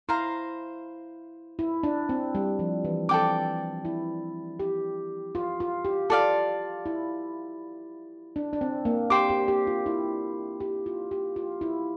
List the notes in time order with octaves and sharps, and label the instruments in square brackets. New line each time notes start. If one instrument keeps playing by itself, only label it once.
[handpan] E4 [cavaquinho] C5 F5 A#5
[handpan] E4
D4
C4
G3
F3
E3
[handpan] C4 [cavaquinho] A4 D5 G5 D6
[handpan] E4
G4
F4
F4
G4
[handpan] F4 [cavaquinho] A4 D5 F5
[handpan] E4
D4
D4
C4
A#3
[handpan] G4 [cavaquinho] C5 G5 D6
[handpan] G4
G4
F4
E4
G4
F4
G4
F4
E4